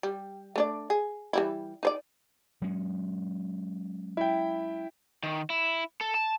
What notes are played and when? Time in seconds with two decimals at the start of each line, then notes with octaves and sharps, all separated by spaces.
0.03 G3
0.56 A3 D4 D5
0.90 G#4
1.33 E3 G3 E4
1.83 D#4 C5 D5
2.62 F#3 G#3 C#4
4.17 E4 G5
5.23 D#3
5.50 E4
6.01 A4
6.14 A5